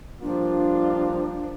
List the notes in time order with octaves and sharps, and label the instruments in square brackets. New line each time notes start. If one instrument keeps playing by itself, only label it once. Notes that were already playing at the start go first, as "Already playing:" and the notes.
[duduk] F3 [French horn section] G3 A#3 F4 [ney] D4